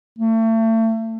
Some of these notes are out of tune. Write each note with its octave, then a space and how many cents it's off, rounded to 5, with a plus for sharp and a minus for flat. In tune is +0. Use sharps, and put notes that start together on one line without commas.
A3 +35